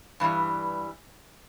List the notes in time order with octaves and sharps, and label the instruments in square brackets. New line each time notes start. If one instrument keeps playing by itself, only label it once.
[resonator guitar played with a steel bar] G2 E3 G3